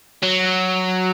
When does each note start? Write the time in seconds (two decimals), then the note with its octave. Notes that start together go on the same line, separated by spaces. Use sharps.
0.23 F#3